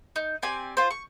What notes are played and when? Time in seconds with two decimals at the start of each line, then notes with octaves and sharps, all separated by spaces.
0.16 D#4
0.43 C4 G4 D5 G#5
0.77 F4 C5
0.91 C#6